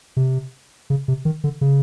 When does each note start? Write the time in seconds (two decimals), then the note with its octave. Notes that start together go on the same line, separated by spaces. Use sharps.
0.17 C3
0.90 C#3
1.08 C3
1.25 D#3
1.44 D3
1.61 C#3